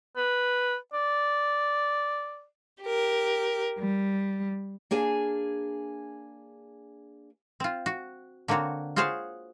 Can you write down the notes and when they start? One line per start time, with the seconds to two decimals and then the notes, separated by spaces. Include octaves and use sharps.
0.17 B4
0.93 D5
2.83 G4 A#4
3.78 G3
4.91 A#3 D4 G#4 G#5
7.60 C4 F4
7.86 F#4
8.48 D3 A#3 C4 F#4 C#5
8.96 F4 F#4 G#4 C5 C#5 F5